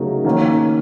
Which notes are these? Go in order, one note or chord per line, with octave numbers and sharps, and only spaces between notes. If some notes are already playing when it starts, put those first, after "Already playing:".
Already playing: C#3 F#3 A3 D#4 A#4
D#3 A#3 C#4